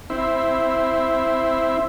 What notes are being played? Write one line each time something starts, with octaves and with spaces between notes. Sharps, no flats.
C4 E4